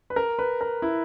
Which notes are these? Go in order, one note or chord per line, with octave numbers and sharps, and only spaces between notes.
B4
A#4
B4
A#4
E4